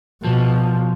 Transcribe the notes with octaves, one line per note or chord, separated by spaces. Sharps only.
B2 F3